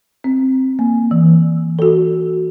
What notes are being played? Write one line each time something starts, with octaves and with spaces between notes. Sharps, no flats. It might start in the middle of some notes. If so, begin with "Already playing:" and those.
C4
A#3
E3
F#4 A4